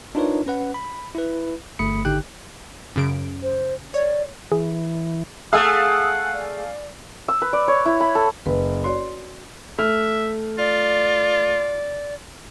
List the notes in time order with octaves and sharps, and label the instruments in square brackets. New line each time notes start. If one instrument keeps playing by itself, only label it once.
[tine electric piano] D4 D#4 F4 A#4 B4 C#5
C#4 B4 F#5
B5
E4 B4
G1 A3 B5 D#6 C#7
G#1 D3 D#4 G4 G5 F#6
[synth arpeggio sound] F#2 C#3 D7
[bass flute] C5
[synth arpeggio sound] C#5 [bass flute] D5
[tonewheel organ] E3 [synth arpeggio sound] G#4
[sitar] A3 G#4 [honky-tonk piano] F5 G#5 E6 [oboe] F#5 [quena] D#6
[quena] D5
[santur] E6
B4
D5
C#5
E4
B5
A4
[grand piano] F#1 [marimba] B4
[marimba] F#4 C#5 D5 [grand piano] C6
[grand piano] A3 F6 [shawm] E5
[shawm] F4 [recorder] D5